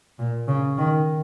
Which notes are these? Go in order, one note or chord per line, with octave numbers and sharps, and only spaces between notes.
A#2
C#3
D#3